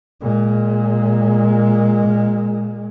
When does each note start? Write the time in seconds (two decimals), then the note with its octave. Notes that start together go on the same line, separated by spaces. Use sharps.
0.21 A#2 G#3